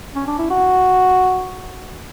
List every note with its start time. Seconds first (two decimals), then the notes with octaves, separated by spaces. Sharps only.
0.15 C#4
0.27 D4
0.38 E4
0.50 F#4